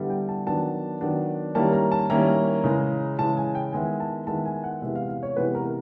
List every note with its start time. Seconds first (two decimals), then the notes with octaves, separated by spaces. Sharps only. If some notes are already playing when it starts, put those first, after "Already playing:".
Already playing: D3 G3 B3 E4
0.10 G5
0.28 A5
0.46 D#3 F#3 B3 D4 A5
1.01 D#3 F#3 B3 D4
1.55 D#3 G3 A#3 C#4 E4 A5
1.73 A#5
1.92 A5
2.10 D#3 G3 A#3 C#4 E4 A#5
2.64 C#3 E3 G#3
3.19 C#3 E3 G#3 A5
3.37 G#5
3.55 G5
3.73 D#3 G#3 B3 E4 G#5
4.00 A5
4.27 D#3 G#3 B3 E4 A5
4.46 G#5
4.64 F#5
4.82 C3 E3 G#3 B3 E5
4.96 F5
5.09 F5
5.23 C#5
5.36 C3 E3 G#3 B3 B4
5.55 A#4